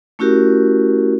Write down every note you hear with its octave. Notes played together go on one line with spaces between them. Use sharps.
A3 C#4 E4 F#4 G4 A#4